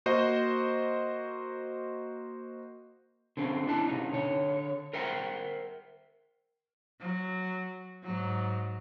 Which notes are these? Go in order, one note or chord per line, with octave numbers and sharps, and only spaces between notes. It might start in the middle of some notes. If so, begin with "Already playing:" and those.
A#3 F#4 C5 D#5
D3 C4 C#4
D4 E4 A5
C3 C#4 D#4
D3 C#5
A#4 C5 E5 F#5 G5
F#3
G#2 F#3